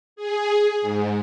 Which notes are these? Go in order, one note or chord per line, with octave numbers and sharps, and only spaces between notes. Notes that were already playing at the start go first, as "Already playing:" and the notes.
G#4
G#2